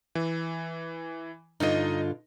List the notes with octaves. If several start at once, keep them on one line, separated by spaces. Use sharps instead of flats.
E3
G2 D3 D#4 F4 D#5